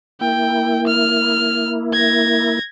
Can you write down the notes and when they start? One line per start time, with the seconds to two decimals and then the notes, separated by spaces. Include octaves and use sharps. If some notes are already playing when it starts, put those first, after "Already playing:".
0.21 A#3 E4 G5
0.87 F6
1.93 G#6 A#6